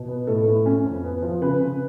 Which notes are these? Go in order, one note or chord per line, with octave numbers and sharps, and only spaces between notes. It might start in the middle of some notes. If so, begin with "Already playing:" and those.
Already playing: B2
B3
A2 A4
A2
C#4
F2
B3
F3
C#3 B4
C#3